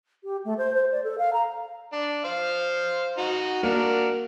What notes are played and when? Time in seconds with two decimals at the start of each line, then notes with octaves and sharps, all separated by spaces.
0.23 G4
0.44 A3
0.57 C5
0.74 C5
0.92 D5
1.03 A4
1.18 F5
1.32 A#5
1.93 D4
2.25 C5 F5
3.18 D#4 F#4
3.63 A#3 D4 F#4 A#4